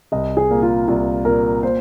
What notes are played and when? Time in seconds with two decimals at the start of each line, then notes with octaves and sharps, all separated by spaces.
0.12 C2 D#5
0.37 G#4
0.50 A#2 A#3
0.62 F4
0.88 C2 F4
1.25 A#2 A#3 A#4
1.63 A#2 C5